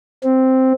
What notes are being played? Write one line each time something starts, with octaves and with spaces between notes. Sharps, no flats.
C4